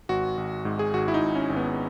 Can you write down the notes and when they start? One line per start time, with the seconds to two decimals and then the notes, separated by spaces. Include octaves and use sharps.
0.09 G#1 F#4
0.37 G#1
0.65 G#2
0.79 G#4
0.94 G#1 F#4
1.08 E4
1.14 D#4
1.22 G#1
1.35 C#4
1.50 G#1
1.56 B3